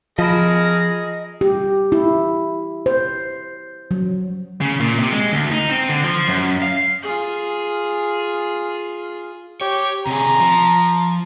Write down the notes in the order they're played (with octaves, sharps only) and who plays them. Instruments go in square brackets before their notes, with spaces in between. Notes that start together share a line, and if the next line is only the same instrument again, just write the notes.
[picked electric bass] F3 [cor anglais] G#4 [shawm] A#4 [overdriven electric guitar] D#5 B5
[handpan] G4
E4
C5
F#3
[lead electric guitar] C#3
A#2
C3
G#3
D2
D#4
C4
D3
F3
F#2
F5
[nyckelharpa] F4 G#4
[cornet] G4 [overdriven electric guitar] C#5
[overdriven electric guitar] C3 G#4 [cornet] A#5
[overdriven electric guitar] F3